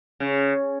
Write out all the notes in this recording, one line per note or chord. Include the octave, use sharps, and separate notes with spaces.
C#3